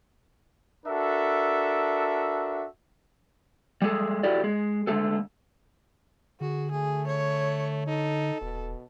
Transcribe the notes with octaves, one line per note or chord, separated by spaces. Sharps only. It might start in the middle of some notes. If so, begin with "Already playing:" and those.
D4 F#4 A4 A#4 E5
G3 G#3 G#4 A4
E4 F#4 G4 A4 D5
G#3 G#4
D3 G#3 A3 G#4 A4
D3 F#4 G#4
A3 G#4
C#5
D#4 A4
D#1 B2